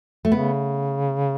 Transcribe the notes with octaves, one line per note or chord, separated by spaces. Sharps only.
A3
C#3 B3